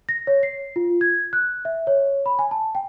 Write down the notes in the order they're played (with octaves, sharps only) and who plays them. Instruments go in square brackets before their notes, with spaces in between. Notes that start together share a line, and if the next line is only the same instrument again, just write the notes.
[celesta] A#6
C#5
C7
F4
G#6
F#6
E5
C#5
B5
G#5
A5
G5